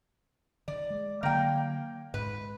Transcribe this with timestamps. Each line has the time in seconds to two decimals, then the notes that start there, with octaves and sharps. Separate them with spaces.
0.68 D#3 D5
0.90 G#3
1.23 D3 D#3 F#3 A#3 G5
2.14 G#2 B4